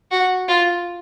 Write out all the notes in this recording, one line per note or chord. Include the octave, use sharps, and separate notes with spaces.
F#4
F4